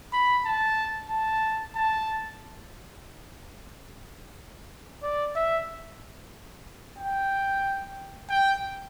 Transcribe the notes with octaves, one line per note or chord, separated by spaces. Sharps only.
B5
A5
A5
A5
D5
E5
G5
G5